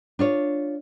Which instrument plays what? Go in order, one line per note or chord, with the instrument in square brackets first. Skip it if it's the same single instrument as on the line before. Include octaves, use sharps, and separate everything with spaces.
[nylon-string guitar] D4 F4 C#5